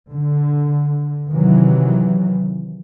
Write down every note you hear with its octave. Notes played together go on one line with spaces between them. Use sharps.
D3
C3 D#3 E3 F#3